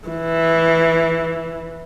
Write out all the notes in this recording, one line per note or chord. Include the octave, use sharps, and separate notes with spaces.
E3